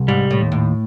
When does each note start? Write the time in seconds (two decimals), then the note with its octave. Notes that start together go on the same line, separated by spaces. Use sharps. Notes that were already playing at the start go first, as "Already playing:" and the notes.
Already playing: C2
0.08 G#2 G3
0.31 A2
0.40 D#2
0.52 A2